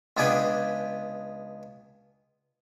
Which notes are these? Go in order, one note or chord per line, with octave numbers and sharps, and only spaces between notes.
C#2 B3 D4 G#4 B4 G5